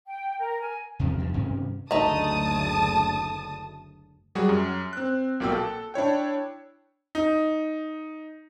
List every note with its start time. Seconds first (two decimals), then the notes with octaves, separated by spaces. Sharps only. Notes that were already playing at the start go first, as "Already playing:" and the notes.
0.07 G5
0.38 A#4
0.60 G#5
0.99 E2 C3 F3
1.18 E2 G2
1.34 G2 C3 D#3 C#4
1.91 F#1 D2 A3 D#4 A5 D#6
4.35 F#3 G3 F#4 G#4
4.49 F#2
4.93 C4 F#6
5.40 B1 A#2 A#3 F#4 G5 E6
5.52 A4
5.94 D4 E4 C#5 G5
7.15 D#4